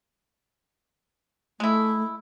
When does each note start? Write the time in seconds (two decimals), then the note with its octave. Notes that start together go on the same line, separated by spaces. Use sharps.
1.60 G#3 A3 E4